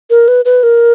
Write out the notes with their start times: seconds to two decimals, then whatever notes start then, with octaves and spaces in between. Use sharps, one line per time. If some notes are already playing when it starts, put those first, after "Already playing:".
0.10 A#4
0.28 B4
0.45 B4
0.63 A#4